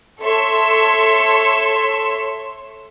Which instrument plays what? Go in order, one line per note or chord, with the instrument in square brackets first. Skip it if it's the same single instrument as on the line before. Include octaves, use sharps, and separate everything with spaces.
[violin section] A4 C#5 E5 C6